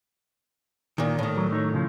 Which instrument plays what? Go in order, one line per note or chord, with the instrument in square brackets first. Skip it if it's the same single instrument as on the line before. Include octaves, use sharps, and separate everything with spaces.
[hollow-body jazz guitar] A#2 D#3
A2 D#3
[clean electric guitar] F#3
A3 D#4 C#5
C#3 F3